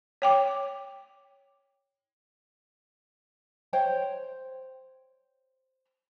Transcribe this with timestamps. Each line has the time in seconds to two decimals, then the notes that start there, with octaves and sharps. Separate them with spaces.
0.22 C#5 G5 D6
3.73 C5 C#5 G5